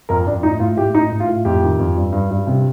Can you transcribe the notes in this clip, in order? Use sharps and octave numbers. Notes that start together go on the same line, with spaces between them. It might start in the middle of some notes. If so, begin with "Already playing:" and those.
F2 A#4
F2 D4
A2 D#4
A2 F4
A2 G4
A2 D#4
A2
F4
A2
F2 G4
D#3
F2
G2
G2
G2
C3